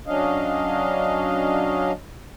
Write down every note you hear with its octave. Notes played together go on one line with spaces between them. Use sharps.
F#3 C#4 D4 D#5 F5